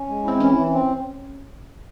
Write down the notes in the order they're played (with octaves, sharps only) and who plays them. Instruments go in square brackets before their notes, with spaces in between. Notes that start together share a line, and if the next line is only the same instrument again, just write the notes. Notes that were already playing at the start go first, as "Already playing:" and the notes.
Already playing: [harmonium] C#4
G#3
[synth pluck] C4 [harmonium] E4
[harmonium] E3 [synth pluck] C#4
[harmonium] E3
C4